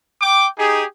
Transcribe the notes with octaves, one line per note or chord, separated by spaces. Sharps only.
G5 D6
D#4 G4 G#4